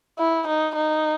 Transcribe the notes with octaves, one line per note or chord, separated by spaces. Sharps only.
E4
D#4
D#4